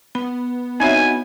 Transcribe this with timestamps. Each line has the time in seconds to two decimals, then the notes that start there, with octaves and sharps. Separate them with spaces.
0.15 B3 B5
0.80 C4 D#4 E4 F#4 C#5 E5 G#5